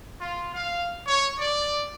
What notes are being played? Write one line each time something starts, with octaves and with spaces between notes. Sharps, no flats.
F4
F5
C#5
D5